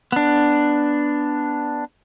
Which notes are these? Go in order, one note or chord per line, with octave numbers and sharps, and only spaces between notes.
B3 D4